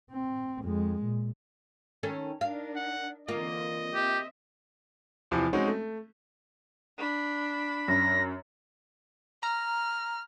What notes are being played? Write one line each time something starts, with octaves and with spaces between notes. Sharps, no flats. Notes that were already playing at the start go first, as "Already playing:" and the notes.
C4
F2 G#3
A#2
D#3 C#4 A4
D4 D#4 A#4 F5
F#5
D3 E3 A#3 C4 F4 D#5
C4 G4 E5
E2 C3 E3 F3
G#3 C4 C#4 D#4 F#4
A3
D4 B5
F#2 A#6
A#5 F6